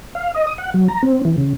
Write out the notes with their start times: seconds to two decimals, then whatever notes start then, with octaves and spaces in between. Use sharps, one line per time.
0.15 F5
0.35 D#5
0.47 D#6
0.58 F#5
0.74 F#3
0.88 A#5
1.03 C4
1.25 E3
1.38 C#3